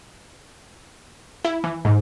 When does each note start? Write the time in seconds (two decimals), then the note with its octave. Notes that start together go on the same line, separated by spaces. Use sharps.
1.45 E4
1.64 E3
1.85 G#2